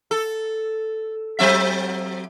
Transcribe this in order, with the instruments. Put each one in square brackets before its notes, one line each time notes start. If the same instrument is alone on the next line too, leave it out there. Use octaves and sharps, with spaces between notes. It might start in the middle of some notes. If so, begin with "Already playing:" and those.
[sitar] A4
F#3 C4 E5